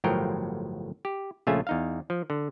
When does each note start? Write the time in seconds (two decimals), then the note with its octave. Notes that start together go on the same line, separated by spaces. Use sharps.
0.04 G1 A2 F3 F#3 A#4 G5
1.05 G4
1.47 A#1 C#3 A3 F4 E5 G#5
1.67 E2 D#4 F5
2.10 F3
2.30 D3